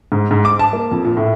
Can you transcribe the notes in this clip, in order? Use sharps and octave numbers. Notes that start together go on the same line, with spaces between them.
G#2
G#2
D6
A5
A#3
F2
A#2
A2